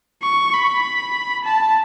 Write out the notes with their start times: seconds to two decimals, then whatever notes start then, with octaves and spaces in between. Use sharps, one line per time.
0.22 C#6
0.53 B5
1.45 A5